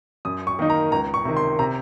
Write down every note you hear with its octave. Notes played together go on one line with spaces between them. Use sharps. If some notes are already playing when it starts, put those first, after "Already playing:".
F#2 D#6
C#6
D#3 A#3 D#4
A#5
C#2 A#5
C#6
C3 D#3
C6
C3 A#5